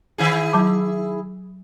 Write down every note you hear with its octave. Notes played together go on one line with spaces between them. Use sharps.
D#3 E4 G#4
F#3 A5 D6